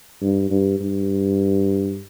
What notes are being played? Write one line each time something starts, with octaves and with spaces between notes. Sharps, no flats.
G2
G2
G2